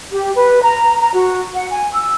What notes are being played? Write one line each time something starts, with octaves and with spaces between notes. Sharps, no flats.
G4
B4
A#5
A#5
F#4
F#5
G#5
E6